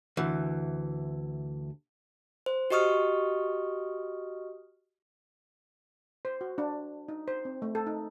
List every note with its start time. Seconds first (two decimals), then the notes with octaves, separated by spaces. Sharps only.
0.17 D2 E3
2.46 C5
2.70 F#4 G4 D#5 C#6 D#6 F6
6.25 C5
6.41 F#4
6.58 D4
7.09 D#4
7.28 C5
7.45 C4
7.62 A3
7.75 A4
7.87 D#4